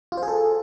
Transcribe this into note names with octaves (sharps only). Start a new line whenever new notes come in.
F4
C5
G#4
A4